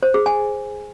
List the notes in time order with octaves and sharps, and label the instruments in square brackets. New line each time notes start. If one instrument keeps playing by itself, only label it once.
[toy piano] C5
G#4
G#5